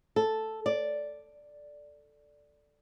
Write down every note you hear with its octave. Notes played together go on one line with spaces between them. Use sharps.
A4
D5